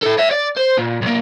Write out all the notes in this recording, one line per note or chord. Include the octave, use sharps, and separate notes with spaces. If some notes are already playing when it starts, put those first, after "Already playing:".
E4 A4
C#5 E5
D5
C5
A#2
B1 A#3